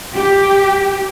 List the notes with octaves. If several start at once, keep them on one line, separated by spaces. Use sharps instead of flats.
G4